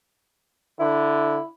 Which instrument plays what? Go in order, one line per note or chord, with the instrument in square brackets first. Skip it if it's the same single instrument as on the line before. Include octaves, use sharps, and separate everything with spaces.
[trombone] D3 [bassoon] E4